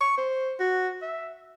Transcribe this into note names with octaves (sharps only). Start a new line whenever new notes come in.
C#6
C5
F#4
E5